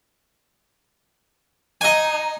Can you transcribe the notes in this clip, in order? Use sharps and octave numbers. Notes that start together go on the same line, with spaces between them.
D#4 D#5 G#5